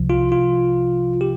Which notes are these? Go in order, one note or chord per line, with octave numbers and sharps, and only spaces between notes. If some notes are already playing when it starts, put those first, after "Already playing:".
Already playing: C2 C3 F3
F4
F4
G4